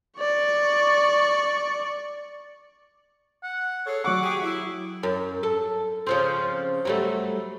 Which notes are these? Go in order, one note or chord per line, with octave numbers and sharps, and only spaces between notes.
D5 C#6
F#5
G#4 A4 C#5
F#3 D5 E5 F#5 C#6 D6
G4 G#4
E4
F#2
A4
C#3 F3 C4
F#3 G3 A3